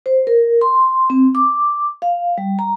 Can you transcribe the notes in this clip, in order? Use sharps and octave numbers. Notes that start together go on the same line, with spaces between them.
C5
A#4
C6
C4
D6
F5
G3
A#5